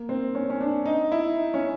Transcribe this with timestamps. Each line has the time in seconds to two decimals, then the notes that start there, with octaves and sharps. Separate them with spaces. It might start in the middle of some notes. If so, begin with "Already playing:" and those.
Already playing: A#3
0.09 C4
0.35 C#4
0.50 C#4
0.61 D4
0.85 D#4
1.11 E4
1.37 D#4
1.54 C#4